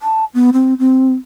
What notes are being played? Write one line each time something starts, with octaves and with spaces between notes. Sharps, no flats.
A5
B3
C4
C4